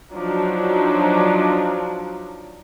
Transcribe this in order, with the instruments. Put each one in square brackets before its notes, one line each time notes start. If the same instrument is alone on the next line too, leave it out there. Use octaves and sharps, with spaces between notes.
[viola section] F3 F#3 D4 D#4